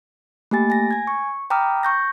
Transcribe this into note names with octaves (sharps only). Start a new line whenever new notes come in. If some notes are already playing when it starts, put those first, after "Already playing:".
A3 A#3 G4 G#5 A6
G#5 A#6
G#5 G#6
C#6
G5 A#5 B5 D6 D#6 F6
C#6 G6 A#6